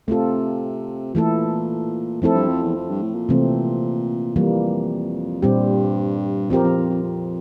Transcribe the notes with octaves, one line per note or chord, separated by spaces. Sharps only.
C3 A3 C4 F4 A4
A#2 E3 A3 E4 A4
A2 F3 C4 E4 A4
G2
F2
E2
F2
G2
A2
A#2
C3 E3 A3 C4
F2 E3 G3 A#3
G2 A#2 G3 C4 G4
F2 F3 C4 G4 A#4
F2
F2
F2
F2